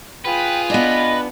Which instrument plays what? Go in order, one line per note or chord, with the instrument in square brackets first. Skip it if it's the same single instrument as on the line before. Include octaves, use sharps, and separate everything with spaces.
[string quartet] F4 G#4 [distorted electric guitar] B4 [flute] G5
[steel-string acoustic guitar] B3 D4 [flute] D#5